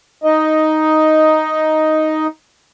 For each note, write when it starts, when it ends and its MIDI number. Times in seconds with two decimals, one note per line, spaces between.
0.24 2.27 63
0.24 2.27 75